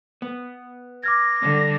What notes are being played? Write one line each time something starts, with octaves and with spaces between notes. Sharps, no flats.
B3
D6 F6 G#6 A#6
D3 G3